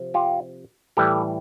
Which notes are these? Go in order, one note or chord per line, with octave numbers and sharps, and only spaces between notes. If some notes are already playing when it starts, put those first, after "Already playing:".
Already playing: C3 F3
F4 G4
A2 E3 G3 G4 A4